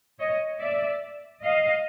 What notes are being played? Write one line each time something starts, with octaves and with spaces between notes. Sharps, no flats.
C#5 D#5
D5 E5
D#5 F5